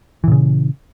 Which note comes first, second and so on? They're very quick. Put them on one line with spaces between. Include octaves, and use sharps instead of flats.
E3 A#2 C#3